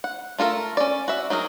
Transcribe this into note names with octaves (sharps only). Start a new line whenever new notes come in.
F#5
A3 F4 A4 A#4
C#4 D5
F#4 E5
F#3 D#4 G#4 A#4